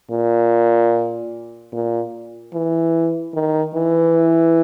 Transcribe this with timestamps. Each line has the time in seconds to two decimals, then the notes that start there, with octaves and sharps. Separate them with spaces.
0.11 A#2
1.72 A#2
2.53 E3
3.34 D#3
3.75 E3